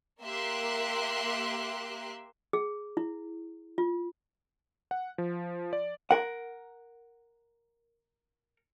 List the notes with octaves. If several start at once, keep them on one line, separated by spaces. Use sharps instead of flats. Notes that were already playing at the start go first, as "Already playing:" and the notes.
A#3 G4 A#4 E5 C6 F#6
G#4
E4
F4
F#5
F3
D5
A#4 F#5